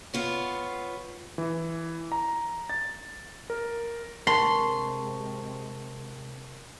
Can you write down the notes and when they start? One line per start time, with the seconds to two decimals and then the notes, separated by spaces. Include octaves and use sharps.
0.14 B3 F4 C#5
1.38 E3
2.12 A#5
2.70 A6
3.50 A#4
4.27 C3 G#3 C4 A#4 A5 C6 C#6